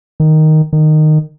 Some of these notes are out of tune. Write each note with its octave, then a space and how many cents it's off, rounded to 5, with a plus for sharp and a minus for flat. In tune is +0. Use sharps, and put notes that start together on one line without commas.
D#3 +0
D#3 -15